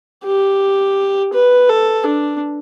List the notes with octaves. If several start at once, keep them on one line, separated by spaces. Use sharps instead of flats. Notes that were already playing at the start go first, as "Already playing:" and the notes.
G4
B4
A4
D4